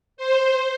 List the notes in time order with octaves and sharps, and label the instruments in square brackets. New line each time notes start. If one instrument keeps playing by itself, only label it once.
[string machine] C5